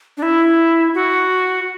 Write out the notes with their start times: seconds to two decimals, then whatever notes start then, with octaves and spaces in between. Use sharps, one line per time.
0.17 D4
0.22 E4
0.94 F#4